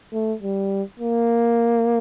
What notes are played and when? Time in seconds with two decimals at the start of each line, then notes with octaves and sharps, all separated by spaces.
0.13 A3
0.42 G3
1.00 A#3